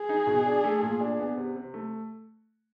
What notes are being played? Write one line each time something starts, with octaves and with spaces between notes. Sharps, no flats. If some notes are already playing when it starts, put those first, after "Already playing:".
Already playing: G#4
D#4
B2
D4
A3
A#2
D4
B3
C3
C3
A3